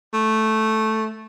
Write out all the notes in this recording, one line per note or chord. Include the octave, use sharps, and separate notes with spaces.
A3